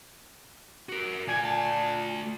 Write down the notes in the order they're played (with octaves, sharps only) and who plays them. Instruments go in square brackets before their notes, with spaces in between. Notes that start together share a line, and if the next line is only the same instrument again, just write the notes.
[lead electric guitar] F#4 A#4
[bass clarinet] A#2 [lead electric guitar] A3 D5 [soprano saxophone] G#5
[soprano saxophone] A5